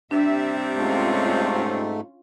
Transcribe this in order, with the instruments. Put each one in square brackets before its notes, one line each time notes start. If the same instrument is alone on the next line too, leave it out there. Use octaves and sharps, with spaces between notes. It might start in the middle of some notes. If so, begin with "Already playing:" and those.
[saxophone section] C3 G3 C4 [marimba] D4 [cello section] E5
[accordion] G#2 A3 [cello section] C#4 F4